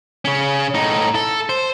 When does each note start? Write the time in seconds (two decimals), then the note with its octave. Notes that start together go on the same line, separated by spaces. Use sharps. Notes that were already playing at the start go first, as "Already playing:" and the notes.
0.25 C#3 C#4
0.74 A2 D#4
1.15 A4
1.49 C5